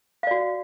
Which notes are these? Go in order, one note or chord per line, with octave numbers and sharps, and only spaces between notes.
F#4 D5 F5